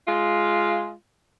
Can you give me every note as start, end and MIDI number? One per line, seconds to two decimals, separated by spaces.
0.07 0.92 56
0.07 0.92 65